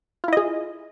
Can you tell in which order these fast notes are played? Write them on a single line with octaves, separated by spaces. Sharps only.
F4 E4 D#5 G#4